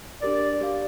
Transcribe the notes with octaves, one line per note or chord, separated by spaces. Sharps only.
D4 G4 A#4 D5
G4 D5 F5